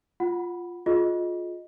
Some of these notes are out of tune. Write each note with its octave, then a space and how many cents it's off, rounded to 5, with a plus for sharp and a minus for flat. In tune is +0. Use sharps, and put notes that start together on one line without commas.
F4 +0 F#5 +0 B5 +0
F4 +20 G#4 +30 D#5 +0